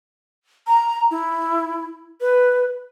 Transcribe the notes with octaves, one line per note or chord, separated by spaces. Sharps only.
A#5
E4
B4